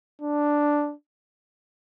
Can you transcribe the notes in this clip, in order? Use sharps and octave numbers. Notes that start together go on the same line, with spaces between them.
D4